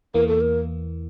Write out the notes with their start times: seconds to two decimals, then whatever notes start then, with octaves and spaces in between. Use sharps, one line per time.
0.14 E2 E3 A#3 A#4
0.28 A4
0.41 A#4